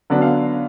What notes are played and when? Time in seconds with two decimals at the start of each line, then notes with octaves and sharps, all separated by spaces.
0.10 D3 F#3 B3 D4
0.22 F5